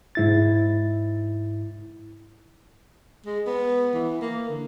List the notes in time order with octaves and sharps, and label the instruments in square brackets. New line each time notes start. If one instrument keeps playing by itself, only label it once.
[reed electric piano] G#2 E4 A6
[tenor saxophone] G#3
B3
E3
A#3
D3